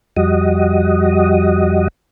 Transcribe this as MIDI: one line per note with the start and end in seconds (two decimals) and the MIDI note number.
0.16 1.88 41
0.16 1.88 55
0.16 1.88 66
0.16 1.88 75